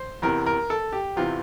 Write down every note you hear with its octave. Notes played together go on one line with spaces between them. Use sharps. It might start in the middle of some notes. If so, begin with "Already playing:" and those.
Already playing: C5
E2 C3 E3 A#4
A#4
A4
G4
E2 C3 E3 F4